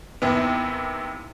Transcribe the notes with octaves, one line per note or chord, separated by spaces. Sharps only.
D#2 C3 E3 B3